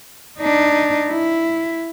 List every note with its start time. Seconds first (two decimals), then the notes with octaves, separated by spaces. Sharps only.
0.39 D4 D#4
1.08 E4